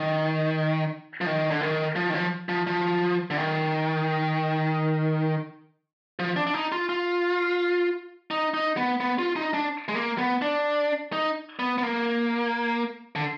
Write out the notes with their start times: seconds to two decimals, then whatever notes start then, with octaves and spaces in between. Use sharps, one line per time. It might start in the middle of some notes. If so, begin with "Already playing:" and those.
Already playing: D#3
1.21 F3
1.26 D#3
1.51 D3
1.61 D#3
1.96 F3
2.10 D#3
2.14 F3
2.49 F3
2.67 F3
3.30 D3
3.37 D#3
6.19 F3
6.36 D4
6.47 D4
6.54 D#4
6.72 F4
6.89 F4
8.31 D#4
8.54 D#4
8.77 B3
9.00 B3
9.19 F4
9.36 D#4
9.54 D4
9.88 G#3
9.95 A#3
10.18 B3
10.42 D4
11.13 D#4
11.59 B3
11.78 B3
11.83 A#3
13.16 D3